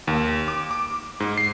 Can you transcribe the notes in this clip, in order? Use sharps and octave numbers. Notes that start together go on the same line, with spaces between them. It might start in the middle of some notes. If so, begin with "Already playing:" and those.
D#2
D6
D6
G#2
C7